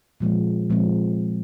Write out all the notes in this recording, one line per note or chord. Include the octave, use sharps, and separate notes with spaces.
A#2 F3 G#3 C4
A#2 F3 G#3 C4